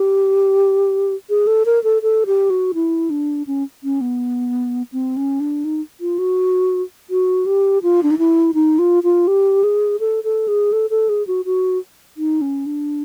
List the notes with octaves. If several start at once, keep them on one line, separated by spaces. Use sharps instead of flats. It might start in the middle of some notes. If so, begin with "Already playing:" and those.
Already playing: G4
G#4
A4
A#4
A4
A4
G4
F#4
E4
D4
C#4
C#4
B3
C4
C#4
D4
D#4
F4
F#4
F#4
G4
F4
D4
D#4
E4
D#4
F4
F4
G4
G#4
A4
A4
G#4
A4
A4
G#4
F#4
F#4
D#4
C#4
D4